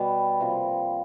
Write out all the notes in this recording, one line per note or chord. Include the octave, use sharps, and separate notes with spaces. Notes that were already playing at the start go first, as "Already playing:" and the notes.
Already playing: B2 G3 B3
C3 F3 A#3